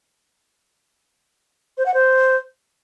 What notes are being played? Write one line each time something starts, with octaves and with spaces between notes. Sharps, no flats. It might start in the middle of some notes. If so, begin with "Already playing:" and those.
C5
F#5
C5